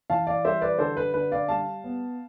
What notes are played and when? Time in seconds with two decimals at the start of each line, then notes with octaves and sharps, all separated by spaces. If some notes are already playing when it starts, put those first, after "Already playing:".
0.10 E3 F5 A5
0.27 D5 F5
0.44 G3 C5 E5
0.61 B4 D5
0.79 D3 A4 C5
0.97 B4
1.14 D3 B4
1.32 D5 F5
1.49 G3 F5 A5
1.84 B3